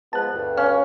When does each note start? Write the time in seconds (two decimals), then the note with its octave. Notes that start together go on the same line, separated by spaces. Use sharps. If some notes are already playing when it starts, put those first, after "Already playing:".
0.13 F3 G#3 B3 A5 F#6
0.32 D2 G2
0.57 C#4 F5